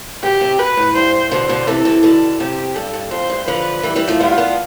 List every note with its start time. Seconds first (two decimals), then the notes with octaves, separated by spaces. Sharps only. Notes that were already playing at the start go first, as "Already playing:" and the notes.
0.23 B2 G4
0.41 C3
0.59 B2 B4
0.77 A2
0.95 G2 C5
1.31 B2 D3 C5
1.49 B2 D3
1.67 C3 E3 A4
1.85 C3 E3
2.03 B2 D3 A4
2.40 C3 G4
2.76 G2 A4
2.94 G2
3.11 F2 C5
3.30 G2
3.48 D3 F3 B4
3.83 E3 G3
3.96 E3 G3
4.08 F3 A3
4.20 G3 B3 F4
4.38 B3 D4